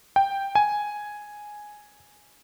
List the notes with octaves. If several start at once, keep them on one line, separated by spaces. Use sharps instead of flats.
G5
G#5